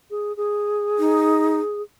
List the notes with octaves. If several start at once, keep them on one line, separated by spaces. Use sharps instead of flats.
G#4
G#4
D#4